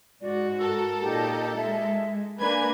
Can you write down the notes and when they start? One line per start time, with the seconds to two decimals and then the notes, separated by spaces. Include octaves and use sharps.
0.22 G#2 F#4 D5
0.60 A4 A#4 E6
1.02 A#2 D#4 G4
1.56 G#3 E5
2.39 A#3 D4 B4 G#5 B5 G#6